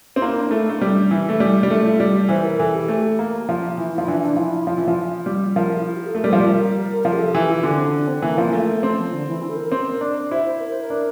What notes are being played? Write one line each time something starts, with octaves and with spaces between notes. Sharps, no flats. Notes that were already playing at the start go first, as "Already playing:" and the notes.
C4 D4
A#3 E4
D4
A3 E4
A3 D4
G3 C4
D4
E3 E4
A3
G3
G3 D4
A3 E4
G4
F4
G3 A4
E3 C5
A#4
E3 A4
G4
A3 G4
A#3
F3
E3 E4
E4
F3
E3 D4
D4
F3 E4
F3 F4
E3
F3
G3
F3 A#4
E4
F4
G4
A4
A3 A#4
G3
F3 C5
G3 A4 A#4
A#4
F3 A#4
G4
A4
E3 G4
F4
D3 D4
C4
D4
C4
E3 A#3
F3
A3
A3 C4
F3
D3
E3
D4
A4
A#4
C4
D4
E4 C5
C5
A#4
C5
A#4
D4